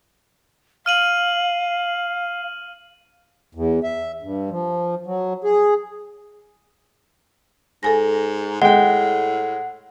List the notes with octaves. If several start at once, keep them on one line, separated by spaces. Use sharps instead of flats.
F5 F6 D#7 F#7
E2
E5
G2
F3
F#3
G#4
G#2 A4 G#5 A#6
A2 G#3 F#5 G5